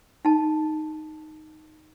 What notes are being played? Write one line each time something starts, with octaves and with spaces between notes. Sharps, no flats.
D#4 A5